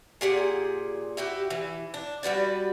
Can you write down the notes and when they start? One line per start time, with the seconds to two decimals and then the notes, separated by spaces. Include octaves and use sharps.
0.21 A#2 G4 G#4 F#5
1.17 E4 F#4 G4
1.50 E3
1.94 D4
2.23 G3 F#4 B4 D5